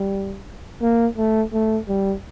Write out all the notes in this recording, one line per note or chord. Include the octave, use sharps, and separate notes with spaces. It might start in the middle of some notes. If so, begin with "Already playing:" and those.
Already playing: G3
A#3
A3
A3
G3